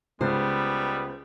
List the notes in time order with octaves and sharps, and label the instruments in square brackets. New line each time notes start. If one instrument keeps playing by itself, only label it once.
[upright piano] C#2 [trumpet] G3 [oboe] B3 [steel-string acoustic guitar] C5